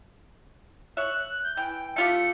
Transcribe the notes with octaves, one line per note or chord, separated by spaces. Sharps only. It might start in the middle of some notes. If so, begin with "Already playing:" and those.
C#5 E5 F#6
G6
E3 G5
A3 F4 G4 C#7